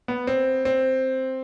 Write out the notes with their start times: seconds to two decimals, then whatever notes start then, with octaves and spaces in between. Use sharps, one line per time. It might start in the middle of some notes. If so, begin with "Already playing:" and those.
0.08 B3
0.27 C4
0.65 C4